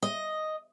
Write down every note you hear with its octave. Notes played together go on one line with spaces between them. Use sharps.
D#5